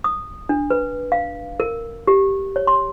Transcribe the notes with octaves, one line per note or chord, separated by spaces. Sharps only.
D#6
D4
B4
F5
A#4
G4
C#5
C6